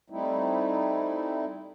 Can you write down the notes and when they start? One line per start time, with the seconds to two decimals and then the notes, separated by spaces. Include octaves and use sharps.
0.10 G3 A3 C4 D#4 E4